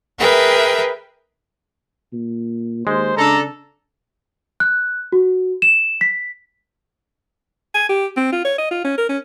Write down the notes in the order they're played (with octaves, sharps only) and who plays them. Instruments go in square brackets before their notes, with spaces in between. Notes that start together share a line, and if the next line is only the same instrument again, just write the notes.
[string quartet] G#4 A#4 B4 E5 G5
[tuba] A#2
[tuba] D#2 [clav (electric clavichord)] G#3 [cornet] C5
[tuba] C#3 [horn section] D4 A4 [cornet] A#5
[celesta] F#6
F#4
E7
B6
[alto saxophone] G#5
G4
C4
F4
C#5
D#5
F4
C#4
A#4
C#4